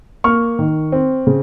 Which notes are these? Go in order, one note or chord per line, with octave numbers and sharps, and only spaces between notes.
A#3 C#6 F6
D#3
C4
C#3